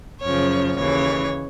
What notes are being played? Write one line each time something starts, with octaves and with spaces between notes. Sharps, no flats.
F#2 C#3 F3 C#5
D#2 C#3 E3 C#5